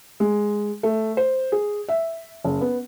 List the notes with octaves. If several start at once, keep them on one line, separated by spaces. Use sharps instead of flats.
G#3
A3
C5
G#4
E5
F#1
B3